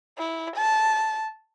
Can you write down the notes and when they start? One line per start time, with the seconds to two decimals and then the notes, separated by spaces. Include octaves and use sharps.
0.18 E4
0.56 A5